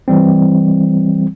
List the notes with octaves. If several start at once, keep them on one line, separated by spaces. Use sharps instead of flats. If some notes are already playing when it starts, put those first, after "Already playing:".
E3 G3 C4